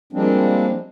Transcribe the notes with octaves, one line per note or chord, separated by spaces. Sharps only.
F3 G3 G#3 A#3 C4 D4